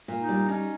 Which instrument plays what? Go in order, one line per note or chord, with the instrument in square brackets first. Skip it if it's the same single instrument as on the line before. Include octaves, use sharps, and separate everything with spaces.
[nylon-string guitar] A#2
[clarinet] D#4
[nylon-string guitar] G3
[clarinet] C#4 [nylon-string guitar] D#4